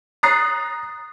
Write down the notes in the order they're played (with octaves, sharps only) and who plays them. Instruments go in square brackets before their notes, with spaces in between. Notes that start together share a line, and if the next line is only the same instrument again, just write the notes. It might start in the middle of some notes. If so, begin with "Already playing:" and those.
[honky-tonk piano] A#5 D#6 F#6 A6 C7